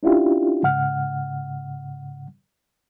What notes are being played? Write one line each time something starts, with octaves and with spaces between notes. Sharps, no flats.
C#4 D4 E4 F4 G4
G#2 C#3 F#5 F6